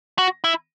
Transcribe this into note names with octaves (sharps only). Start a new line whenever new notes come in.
F#4
E4